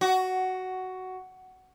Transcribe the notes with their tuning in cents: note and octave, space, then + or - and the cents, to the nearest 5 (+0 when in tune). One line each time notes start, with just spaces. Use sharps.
F#4 +10